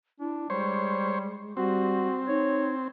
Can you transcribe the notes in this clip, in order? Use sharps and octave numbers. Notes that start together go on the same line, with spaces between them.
D4 E4
G3 G#3 C5 C#5
G3 C4 F#4
D#4 C#5